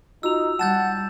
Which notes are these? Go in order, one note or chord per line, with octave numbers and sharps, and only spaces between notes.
D#4 F4 F#4 E6 F7
G3 F#5 A5 G6 A6 E7